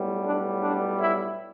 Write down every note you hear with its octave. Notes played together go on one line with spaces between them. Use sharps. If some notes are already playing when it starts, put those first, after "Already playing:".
Already playing: B1 A2 G3 B3
D4
D4
E4